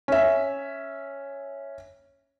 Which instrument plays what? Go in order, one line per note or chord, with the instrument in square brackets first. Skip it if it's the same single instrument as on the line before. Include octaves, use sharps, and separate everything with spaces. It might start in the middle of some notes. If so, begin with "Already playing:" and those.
[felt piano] C#4 E5